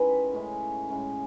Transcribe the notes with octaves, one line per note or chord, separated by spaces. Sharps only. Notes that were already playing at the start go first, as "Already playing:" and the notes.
Already playing: D#3 G#3 C#4 E4 B4
A2 G#3 C#4 E4
A2 G#3 C#4 E4